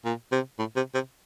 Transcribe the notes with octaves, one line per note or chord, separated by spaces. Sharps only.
A#2
C3
A2
C3
C3